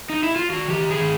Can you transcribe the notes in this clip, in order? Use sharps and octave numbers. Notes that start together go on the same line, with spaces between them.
D#4
E4
F4
D#3 F#4
D#3 G4
D#3
G#4
D#3